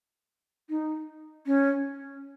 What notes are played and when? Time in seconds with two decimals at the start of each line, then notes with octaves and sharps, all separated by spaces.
0.69 D#4
1.46 C#4